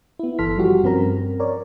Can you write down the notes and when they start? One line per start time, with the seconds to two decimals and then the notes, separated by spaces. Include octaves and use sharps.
0.19 B3 E4
0.39 G1 E3 A4 C6 F6 B6
0.57 F3 G3 F#4 G4
0.83 G2 F3 C4 C#4 A#4 A#5
1.40 A#4 C#5 D5